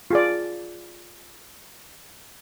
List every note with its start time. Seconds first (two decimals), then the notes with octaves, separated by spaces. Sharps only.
0.11 F4 G#4 D5